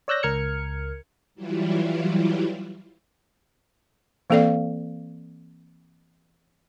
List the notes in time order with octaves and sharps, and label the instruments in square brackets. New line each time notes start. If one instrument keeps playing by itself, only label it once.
[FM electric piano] C#5 D5 E6 F#6 G6 A#6
C#2 A#4 F6 G#6 C#7
[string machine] E3 F#3 G3 E4 F4
[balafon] E3 A#3 C4 A4 D5 F5